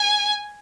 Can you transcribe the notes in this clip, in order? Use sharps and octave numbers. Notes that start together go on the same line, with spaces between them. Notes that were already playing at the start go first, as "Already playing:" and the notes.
Already playing: G#5